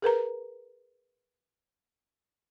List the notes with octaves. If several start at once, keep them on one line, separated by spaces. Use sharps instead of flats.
G#4 A#4 B4 A#5